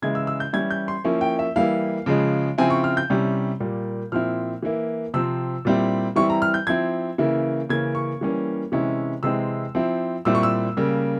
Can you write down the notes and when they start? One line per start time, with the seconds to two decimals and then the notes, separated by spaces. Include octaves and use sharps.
0.02 C#3 E3 G#3 E4 G#6
0.15 E6
0.27 E6
0.40 G6
0.53 E3 G3 C#4 E4 G#6
0.71 G6
0.88 C6
1.05 F3 A#3 C#4 E4
1.21 G5
1.39 E5
1.56 E3 G3 A#3 E4 F5
2.06 C#3 F3 G#3
2.58 C#3 F3 C4 E4 G#5
2.70 C#6
2.84 F6
2.97 G6
3.10 C3 G3 C#4 E4
3.60 A#2 G3 A#3
4.12 A#2 F3 C4 E4 F6
4.63 E3 A#3 E4
5.14 C3 F3 C4 E6
5.65 A#2 G3 C4 E4
6.16 E3 G3 C4 E4 C#6
6.30 A#5
6.42 F6
6.54 G6
6.67 F3 C4 E4 G#6
7.18 C#3 E3 A#3 E4
7.69 C#3 E3 A#3 C#4 G#6
7.95 C#6
8.21 E3 G3 A#3 C#4
8.72 C3 E3 G#3 C#4 E4
9.23 C3 E3 G#3 C4 E4 E6
9.75 F3 C4 E4
10.25 A#2 G3 C4 E4 E6
10.35 C#6
10.43 E6
10.77 C#3 G3 A#3